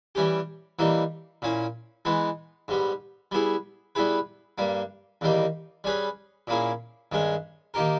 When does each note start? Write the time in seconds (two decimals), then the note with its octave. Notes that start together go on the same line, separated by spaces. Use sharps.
0.15 E3 G3 C#4 G4
0.79 E3 G3 A#3 D#4
1.42 A#2 A#3 C#4 E4
2.05 E3 G#3 B3 D#4
2.68 G#2 G3 B3
3.32 G3 B3 E4 G#4
3.95 G3 B3 E4 G#4 B4
4.58 G2 G3 A#3
5.21 E2 D#3 G3 A#3 D#4
5.84 G3 C#4 G#4 B4
6.47 A#2 A#3 C#4 E4 G#4
7.12 G2 D#3 G#3 C#4
7.74 D#3 A#3 D#4 G4 A#4